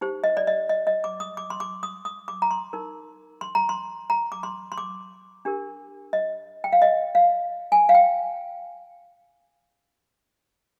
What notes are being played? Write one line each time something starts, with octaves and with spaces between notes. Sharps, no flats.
D#4 G4 C5
D#5
D5
D#5
D#5
D#5
D6
D#6
D6
C6
D6
D#6
D#6
D6
A#5
C6
D#4 A#4
C6
A#5
C6
A#5
D6
C6
C6
D6
D4 G4 A#4
D#5
G5
F5
D#5
F5
G#5
F5
G5